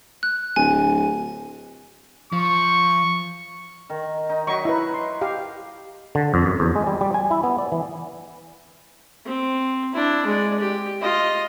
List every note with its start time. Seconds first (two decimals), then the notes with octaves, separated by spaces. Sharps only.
0.23 F#6
0.56 D1 G#5
2.33 F3 C#6
3.90 D#3
4.30 D#4
4.47 F#3 D#4 E5 C#6
4.65 E4 B4
4.94 C6
5.21 G4 F5
6.15 D3
6.34 F2
6.46 F#2
6.60 E2
6.76 G#3
6.87 G3
7.01 G3
7.14 G#5
7.31 E4
7.44 B3
7.58 D5
7.72 E3
9.26 C4
9.94 D4 E4
10.26 G#3 D5
10.60 G4
11.02 F4 D#5